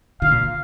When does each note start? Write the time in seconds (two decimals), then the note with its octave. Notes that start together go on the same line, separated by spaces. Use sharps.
0.22 D3 F5
0.31 A#2